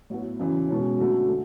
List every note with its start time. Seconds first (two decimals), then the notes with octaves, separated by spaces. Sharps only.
0.10 A2 F#3 B3 F#4
0.39 F#2 C#3 E3
0.68 B2 G#3 C#4
0.98 F#2 D3 F#3 A3
1.28 D3 A3